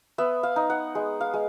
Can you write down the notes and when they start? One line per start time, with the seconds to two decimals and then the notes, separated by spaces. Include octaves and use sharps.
0.18 B3 E5
0.43 F5
0.56 D#4
0.70 F#5
0.95 G#3
1.21 F5
1.34 G#3